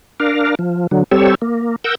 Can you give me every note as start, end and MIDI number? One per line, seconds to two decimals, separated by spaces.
0.20 0.55 62
0.20 0.55 70
0.20 0.55 77
0.59 0.87 53
0.91 1.04 50
0.91 1.04 54
1.11 1.35 55
1.11 1.35 60
1.11 1.35 67
1.11 1.35 69
1.11 1.35 73
1.11 1.35 88
1.42 1.76 58
1.84 1.95 70
1.84 1.95 78
1.84 1.95 88
1.84 1.95 91